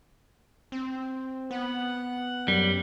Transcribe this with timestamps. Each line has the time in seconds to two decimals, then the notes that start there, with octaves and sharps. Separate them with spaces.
0.72 C4
1.51 B3 F#5
2.48 F#2 G3